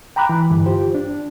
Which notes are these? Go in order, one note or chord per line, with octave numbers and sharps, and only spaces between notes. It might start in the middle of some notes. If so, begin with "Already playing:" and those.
G5 A#5 B5 D6 F#6
E3
G2 D3 E3
F4 G4 C5
D4